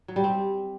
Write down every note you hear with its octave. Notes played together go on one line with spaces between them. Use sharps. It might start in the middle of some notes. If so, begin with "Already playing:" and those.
F#3
G3
C4